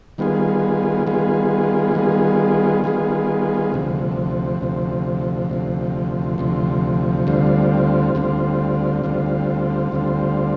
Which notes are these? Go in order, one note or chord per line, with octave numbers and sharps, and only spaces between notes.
D#3 G3 B3 F4 G#4
D#3 G3 B3 F4 G#4
D#3 G3 B3 F4 G#4
D#3 G3 B3 F4 G#4
D2 C3 F3
D2 C3 F3
D2 C3 F3
D2 C3 F3
D2 D3 G3 C4 F4
D2 D3 G3 C4 F4
D2 D3 G3 C4 F4
D2 D3 G3 C4 F4